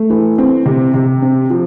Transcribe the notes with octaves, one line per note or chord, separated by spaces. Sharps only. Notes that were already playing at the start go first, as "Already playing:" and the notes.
Already playing: A3
E3
C4
C3
C3
C4
F3